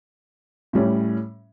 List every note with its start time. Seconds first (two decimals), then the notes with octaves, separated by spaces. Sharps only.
0.73 A2 G3 C#4